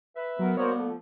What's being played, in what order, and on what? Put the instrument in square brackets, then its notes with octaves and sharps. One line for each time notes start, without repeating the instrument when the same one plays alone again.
[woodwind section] B4 E5
[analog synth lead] F#3 [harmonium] B3 A#4
[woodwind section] G3 A#3 B3 [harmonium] F#4 A#4 C5 [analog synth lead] C#5
[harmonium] F3 [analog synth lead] A3